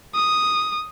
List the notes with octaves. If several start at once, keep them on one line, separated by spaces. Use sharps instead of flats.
D#6